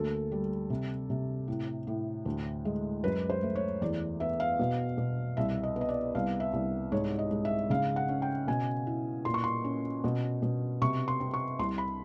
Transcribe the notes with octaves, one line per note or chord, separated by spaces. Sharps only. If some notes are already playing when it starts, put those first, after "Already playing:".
Already playing: D2 A#3 A4
G3
C3
C3
A2
A2
D2
G#3
F#2 B4
C5
A3
C#5
E2 D5
B3 E5
F5
B2
B2
C2 E5
D#5
B3
D#5
D5
C2 F5
E5
C2
G#2 C#5
D#5
G#2
E5
C#3 F5
F#5
C#4
G5
B2 G#5
E4
A#2 C6
C#6
C6
C#4
B2
B2
C3 C#6
C6
C4
C#6
C2 C6
B5